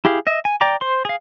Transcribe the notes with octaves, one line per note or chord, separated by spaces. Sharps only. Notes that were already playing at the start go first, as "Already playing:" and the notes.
E4 G4 G#4 F5
D#5 E5
G#5
D5 G5 A#5 D6
C5 C6
G#4 F5